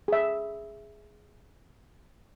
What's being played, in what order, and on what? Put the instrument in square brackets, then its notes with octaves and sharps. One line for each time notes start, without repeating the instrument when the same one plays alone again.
[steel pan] G#4 E5